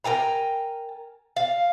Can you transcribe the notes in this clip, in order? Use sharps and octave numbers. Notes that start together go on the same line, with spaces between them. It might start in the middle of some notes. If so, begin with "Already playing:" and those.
A#4 G5 G#5 A#5
F5